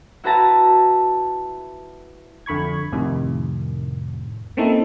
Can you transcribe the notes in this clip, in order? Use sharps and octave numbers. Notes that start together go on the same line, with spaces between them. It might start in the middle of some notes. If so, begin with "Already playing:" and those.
E4 F#4 B4 E5 A5 A#5
F2 D3 B5 C#6 G#6
F2 A2 C3 D#3
A#3 C4 C#4 D#4 E4 A4